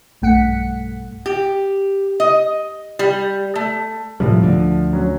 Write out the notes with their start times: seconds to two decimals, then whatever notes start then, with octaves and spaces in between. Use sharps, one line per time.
0.22 B1 G2 A3 F#5 B6 C#7
1.26 G4
2.20 D#5
2.99 G3
3.56 A3
4.20 A2 C3 F3 G3
4.42 D2 D3
4.93 F#3 C#4